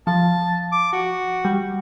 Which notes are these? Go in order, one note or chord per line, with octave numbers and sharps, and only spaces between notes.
F3 A5
D6
F#4
G3